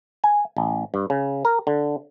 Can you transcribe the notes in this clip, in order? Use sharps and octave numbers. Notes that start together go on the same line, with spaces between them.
G#5
A1
G2
C#3
A#4
D3